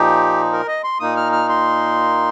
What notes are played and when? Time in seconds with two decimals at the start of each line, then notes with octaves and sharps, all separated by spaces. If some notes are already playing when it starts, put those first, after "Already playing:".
Already playing: A#2 F3 D#4 G4
0.53 A#4
0.67 D#5
0.84 C6
1.00 A#2 A#3 D#4 D#6
1.17 F6
1.33 F6
1.49 C6